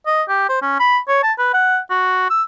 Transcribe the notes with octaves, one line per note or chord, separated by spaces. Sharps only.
D#5
G4
C5
C#4
B5
C#5
A5
B4
F#5
F#4
E6